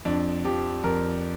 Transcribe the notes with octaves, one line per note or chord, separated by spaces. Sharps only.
F2 D4
F3 G4
F2 A#4